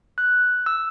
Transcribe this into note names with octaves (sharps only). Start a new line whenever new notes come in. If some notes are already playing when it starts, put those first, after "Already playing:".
F#6
E6